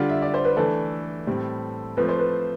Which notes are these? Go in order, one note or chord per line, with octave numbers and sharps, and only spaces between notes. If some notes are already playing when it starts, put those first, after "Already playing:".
Already playing: D3 G3 D4 F4
E5
D5
C5
B4
E3 A3 D4 A4
A2 G3 C4
F3 A3 C4 B4
C5
B4